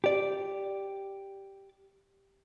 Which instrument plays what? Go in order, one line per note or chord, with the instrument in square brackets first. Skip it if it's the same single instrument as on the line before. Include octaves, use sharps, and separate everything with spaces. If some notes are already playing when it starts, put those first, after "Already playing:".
[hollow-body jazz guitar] G4 D5